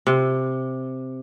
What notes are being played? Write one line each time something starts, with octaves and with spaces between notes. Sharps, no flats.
C3